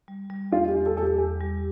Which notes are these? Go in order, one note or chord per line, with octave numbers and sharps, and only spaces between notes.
G3
G3
E2 F4
G4
E2
A4
E2 A4
G4
E2
G3